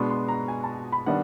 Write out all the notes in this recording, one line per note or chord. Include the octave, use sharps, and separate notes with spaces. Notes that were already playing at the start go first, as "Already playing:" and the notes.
Already playing: B2 G#3 B3 D4 C6
C6
A#5
G#5
A5
B5
D#3 G3 B3 D4 F#5